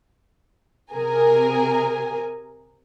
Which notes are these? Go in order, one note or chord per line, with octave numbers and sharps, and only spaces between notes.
C3 G#4 A#4 G#5